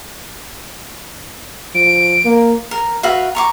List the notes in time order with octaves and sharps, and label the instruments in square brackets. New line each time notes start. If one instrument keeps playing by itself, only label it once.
[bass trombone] F3 [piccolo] D7
[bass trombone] A#3
[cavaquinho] A#4
F#4 B4 E5 F5
A#5 C#6 D6